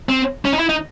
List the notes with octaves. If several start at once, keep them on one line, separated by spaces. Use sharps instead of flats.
C4
C#4
D#4
E4
D#4